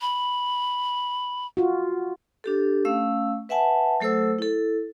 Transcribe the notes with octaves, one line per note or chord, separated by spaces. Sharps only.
B5
F4 F#4
D4 G4 A4
A3 C#4 F5 E6
B4 E5 F#5 G#5 A5
F#3 A3 A4 C5 E6
E4 A4